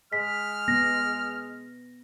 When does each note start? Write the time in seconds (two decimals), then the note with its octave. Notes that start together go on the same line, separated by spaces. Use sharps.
0.13 G#3 F6 B6
0.68 B3 A#6